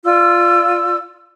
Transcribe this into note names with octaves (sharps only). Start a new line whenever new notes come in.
F4 D5 E6